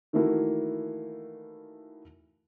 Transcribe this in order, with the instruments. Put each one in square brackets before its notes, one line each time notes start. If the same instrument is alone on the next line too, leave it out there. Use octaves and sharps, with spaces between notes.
[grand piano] D#3 E3 A3 A#3 E4 F#4